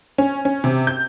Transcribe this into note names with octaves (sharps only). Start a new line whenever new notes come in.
C#4
C#4
C3
G6